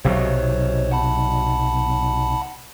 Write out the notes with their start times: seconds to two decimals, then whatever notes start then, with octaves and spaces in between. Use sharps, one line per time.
0.05 B1 C3 F#3 C5 C#5
0.92 F#5 A5 B5